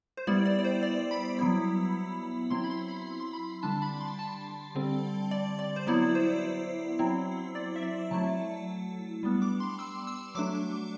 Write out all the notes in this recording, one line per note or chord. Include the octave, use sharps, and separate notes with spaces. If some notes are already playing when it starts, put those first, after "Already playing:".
C5
G3 B3 E4 D5
D5
D5
C5
D5
B5
F#3 B3 E4
F#3 C4 E4 C6
B5
C6
B5
B5
C6
B5
D3 G3 D4 A5
B5
C6
A5
D3 G3 C4
D5
D5
C5
F#3 B3 E4 D5
C5
F#3 C4 E4
D5
E5
D5
F#3 A3 E4 A5
G3 B3 D4
D6
C6
E6
E6
F#3 A3 D4 D6